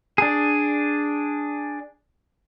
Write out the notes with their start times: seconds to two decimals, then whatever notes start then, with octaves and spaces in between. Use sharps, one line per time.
0.18 D4 G#4